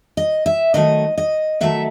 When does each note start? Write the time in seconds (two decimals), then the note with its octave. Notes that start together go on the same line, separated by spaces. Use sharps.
0.17 D#5
0.46 E5
0.74 D#3 F#3 A3 D#5
1.18 D#5
1.61 D#3 F#3 A3 E5